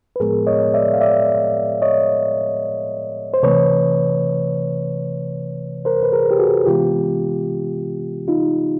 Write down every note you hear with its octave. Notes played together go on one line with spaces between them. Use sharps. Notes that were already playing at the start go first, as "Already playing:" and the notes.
B4
A2 F3 G#3 B3 G#4 A#4
C#5 D#5
D5 E5
F5
D5 E5
C#5 D#5
C5
C3 E3 A3 B4 C#5
A#4 C5
B4
G#4 A#4
G4
F#4 G#4
C3 E3 G#3 B3 F4 G4
D#4 F4